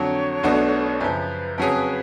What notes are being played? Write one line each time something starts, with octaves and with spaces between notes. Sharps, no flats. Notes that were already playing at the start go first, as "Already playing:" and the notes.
Already playing: F2 D3 F#3 C#5
B1 B2 A3 D4 F#4
F#2 C#3 F3 B4
F2 C#3 F#3 C#4 G#4